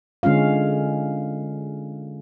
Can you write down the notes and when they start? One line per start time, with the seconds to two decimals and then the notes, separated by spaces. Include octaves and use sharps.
0.23 D3 G#3 C#4 F4 F5